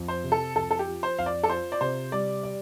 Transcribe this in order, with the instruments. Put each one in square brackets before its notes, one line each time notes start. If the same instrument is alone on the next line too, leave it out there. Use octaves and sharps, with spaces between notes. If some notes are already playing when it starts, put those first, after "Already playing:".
Already playing: [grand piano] F2
[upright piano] C5
[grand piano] C3
[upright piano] A4
[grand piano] F2 [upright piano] A4
[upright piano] A4
G4
[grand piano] F3
[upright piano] C5
[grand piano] F2 [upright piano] F5
[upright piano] D5
A4
[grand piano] F4 [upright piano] C5
[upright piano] D5
[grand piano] C3 [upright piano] C5
[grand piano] G3 [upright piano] D5
[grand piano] D5